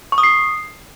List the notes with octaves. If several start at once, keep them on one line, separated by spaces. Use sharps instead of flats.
C#6
D#6
C7